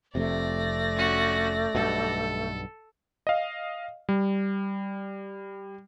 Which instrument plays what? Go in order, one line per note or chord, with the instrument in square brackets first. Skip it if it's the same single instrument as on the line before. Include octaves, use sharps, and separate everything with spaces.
[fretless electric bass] F1 F2 C3 [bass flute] A3 [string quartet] D5 A#6
[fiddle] C#4 F#4
[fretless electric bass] B1 G2 B2 [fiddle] A4
[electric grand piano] D#5 F5
G3